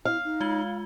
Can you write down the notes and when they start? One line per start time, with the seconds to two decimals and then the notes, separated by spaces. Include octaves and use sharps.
0.05 E4 F5
0.25 D#4
0.40 G#3 F4 G7